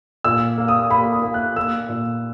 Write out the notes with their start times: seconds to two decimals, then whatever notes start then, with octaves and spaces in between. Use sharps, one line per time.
0.24 A#2 E6
0.58 A#3
0.68 D#6
0.90 A#3 B5
1.13 D#6
1.23 A#3
1.34 F#6
1.56 A#3 E6
1.89 A#2